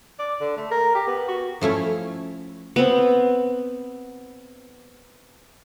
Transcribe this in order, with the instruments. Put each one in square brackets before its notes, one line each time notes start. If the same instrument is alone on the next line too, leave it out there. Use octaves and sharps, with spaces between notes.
[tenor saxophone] D5
D3
A3
A#4
G4
B3
F#4
[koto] F3 A3 C#4 E4
[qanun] B3 C4